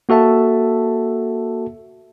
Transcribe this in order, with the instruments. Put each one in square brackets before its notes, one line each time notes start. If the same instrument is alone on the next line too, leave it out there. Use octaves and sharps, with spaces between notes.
[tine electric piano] A#3 F#4 A4 E5 A5